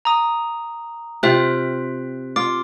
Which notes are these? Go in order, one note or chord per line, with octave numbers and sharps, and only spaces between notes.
A#5 D#6
C3 F4 E5 G5 F#6
F4 D6